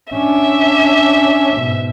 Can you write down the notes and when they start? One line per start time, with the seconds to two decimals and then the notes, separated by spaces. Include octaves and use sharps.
0.14 C#4 D4 E5
1.57 G#2 B2